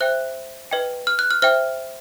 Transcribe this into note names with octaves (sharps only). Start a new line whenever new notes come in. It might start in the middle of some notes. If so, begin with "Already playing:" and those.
C5 E5 G5 F#6
B4 D#5 G5
F6
F#6
F6
C5 E5 G5 F6